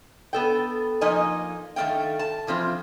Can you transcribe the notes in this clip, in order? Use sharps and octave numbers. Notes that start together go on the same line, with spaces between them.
B3 A4 G5
F3 A#3 D#4 D#5 G#5
D#3 A3 A#3 F5 G5
A5
E3 F3 C4 F4